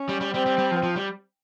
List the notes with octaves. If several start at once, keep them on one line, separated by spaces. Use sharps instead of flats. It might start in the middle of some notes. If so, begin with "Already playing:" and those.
Already playing: C#4
G3
G3
G3 C4
G3
G3
F3
F3
G3